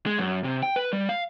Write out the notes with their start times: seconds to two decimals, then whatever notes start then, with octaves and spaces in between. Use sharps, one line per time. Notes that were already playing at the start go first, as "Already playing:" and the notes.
0.06 G#3
0.19 F#2
0.44 C3
0.63 G5
0.76 B4
0.93 G3
1.09 F5